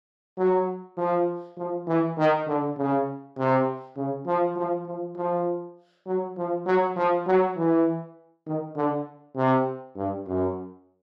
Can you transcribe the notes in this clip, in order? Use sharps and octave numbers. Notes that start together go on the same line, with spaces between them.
F#3
F3
F3
E3
D#3
D3
C#3
C3
C#3
F3
F3
F3
F3
F#3
F3
F#3
F3
F#3
E3
D#3
D3
C3
G2
F#2